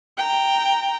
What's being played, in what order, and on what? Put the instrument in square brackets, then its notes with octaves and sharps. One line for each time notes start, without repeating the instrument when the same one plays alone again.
[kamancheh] G5 A#5